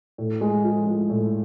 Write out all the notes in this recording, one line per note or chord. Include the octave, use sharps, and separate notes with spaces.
A2
G#3
F3
G#3
A2